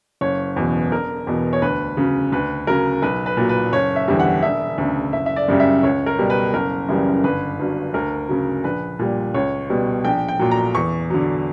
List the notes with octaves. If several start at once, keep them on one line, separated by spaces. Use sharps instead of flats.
F#1 C#5
E2 B2
E1 A#4
E2 B2
C#5
D2 B4
C#3 F#3
D2 B4
C#3 F#3 A#4
B1 B4
B4
A#2 F#3
B4
F#1 C#5
E5
E2 D3 G3
F#5
E1 E5
D2 C#3
F#1 E5
E5
D5
F#2 C#3 G3
E5
C#2 C#5
A#4
B2 G3
B4
F#1 A#4
F#2 C#3 E3 G3
G1 B4
G2 F#3
D2 A#4
C#3 F#3
A#1 B4
A#2 G3
C#2 C#5
B2 G3
A#1 G5
G5
A#2 F#3
A#5
E2 C#6
D3 F#3